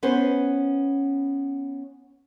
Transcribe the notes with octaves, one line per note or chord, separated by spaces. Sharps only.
B3 C#4 B4 C5